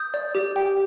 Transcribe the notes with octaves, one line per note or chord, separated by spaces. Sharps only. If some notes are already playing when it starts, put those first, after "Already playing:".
Already playing: D#6 G6
D5
G4
G5